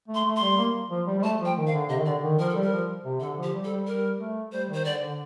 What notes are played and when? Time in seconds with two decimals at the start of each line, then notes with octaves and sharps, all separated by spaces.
0.08 A3
0.15 C6
0.25 A3
0.36 C6
0.41 G3
0.58 A#3
0.91 F3
1.07 G3
1.19 G3
1.23 A3 A5
1.40 F3
1.45 G5
1.57 D#3
1.67 F5
1.73 D3
1.89 C3 D#5
1.99 D#3
2.06 D3 D5
2.23 D#3
2.39 F3 A#4
2.49 A4
2.55 G3
2.62 A#4
2.72 F3
3.05 C3
3.20 D3 A4
3.38 F3
3.43 G4
3.53 G3
3.64 A4
3.70 G3
3.87 G3 A#4
4.19 A3
4.52 G3 C5
4.69 D#3 C5
4.85 D3 D5
5.02 D3